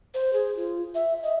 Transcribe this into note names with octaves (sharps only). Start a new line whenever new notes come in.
C5
G#4
F4
E5
D#5